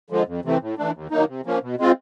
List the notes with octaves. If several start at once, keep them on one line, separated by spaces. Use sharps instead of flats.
D3 F3 G#3
F2
C3 E3 A3 C4
A2
E3 A3 D4
D#2
D#3 F#3 A#3 D#4
C3
F3 A#3 C#4
B2
G#3 C4 F4